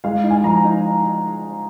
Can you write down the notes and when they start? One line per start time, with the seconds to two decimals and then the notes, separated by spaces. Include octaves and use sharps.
0.04 G#3 F5
0.24 D#4
0.30 G#5
0.44 F3 A#5
0.65 D#4